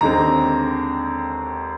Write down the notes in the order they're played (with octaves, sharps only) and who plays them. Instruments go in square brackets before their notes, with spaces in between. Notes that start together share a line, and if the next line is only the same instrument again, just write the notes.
[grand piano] D#2 D3 G#3 C4 A#5